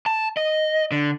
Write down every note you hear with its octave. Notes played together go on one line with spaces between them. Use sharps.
A5
D#5
D3